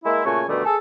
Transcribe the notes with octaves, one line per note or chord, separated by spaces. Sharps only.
G#3 A#3 E4
A#2 C#3 A3 F#4 G#5
B2 D3 D#3 G3 A3
G#4 A4